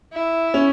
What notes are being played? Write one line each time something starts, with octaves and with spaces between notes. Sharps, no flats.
E4
C#4